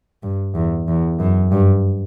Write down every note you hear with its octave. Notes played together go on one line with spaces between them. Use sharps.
G2
E2
E2
F#2
G2